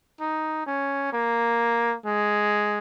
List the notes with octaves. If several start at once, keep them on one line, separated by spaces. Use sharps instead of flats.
D#4
C#4
A#3
G#3